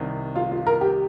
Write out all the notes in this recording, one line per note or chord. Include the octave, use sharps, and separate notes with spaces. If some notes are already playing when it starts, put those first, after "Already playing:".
Already playing: C2 C3 D#3
F4
F4
A#4
G4